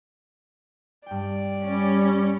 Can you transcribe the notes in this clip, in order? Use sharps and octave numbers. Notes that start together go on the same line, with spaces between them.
G2 D5 G5
G3 C#4